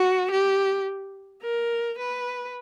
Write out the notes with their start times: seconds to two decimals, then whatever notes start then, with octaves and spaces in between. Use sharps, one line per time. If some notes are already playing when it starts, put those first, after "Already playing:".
Already playing: F#4
0.31 G4
1.43 A#4
1.98 B4